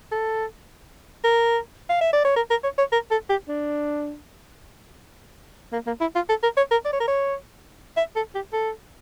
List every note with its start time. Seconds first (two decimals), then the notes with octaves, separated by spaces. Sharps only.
0.12 A4
1.24 A#4
1.89 F5
2.01 E5
2.13 D5
2.24 C#5
2.36 A#4
2.50 A#4
2.64 C#5
2.78 C#5
2.92 A#4
3.11 A4
3.30 G4
3.48 D4
5.73 A#3
5.87 A#3
6.01 E4
6.15 F4
6.29 A4
6.43 A#4
6.57 C#5
6.71 A#4
6.85 D5
6.93 C#5
7.00 A#4
7.07 C#5
7.97 E5
8.16 A4
8.35 G4
8.53 A4